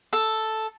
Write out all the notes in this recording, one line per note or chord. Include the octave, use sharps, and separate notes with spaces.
A4